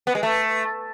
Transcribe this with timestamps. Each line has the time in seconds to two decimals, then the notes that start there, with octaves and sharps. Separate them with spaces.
0.07 B3
0.15 G#3
0.23 A3